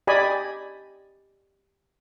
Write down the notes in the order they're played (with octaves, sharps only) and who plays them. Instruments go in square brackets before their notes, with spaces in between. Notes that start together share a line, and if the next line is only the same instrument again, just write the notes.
[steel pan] G4 D5 D#5 G#5 B5